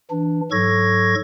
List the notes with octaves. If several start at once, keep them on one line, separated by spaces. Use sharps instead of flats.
E3 D4
G#2 F#3 A4 C#6 G#6 A#6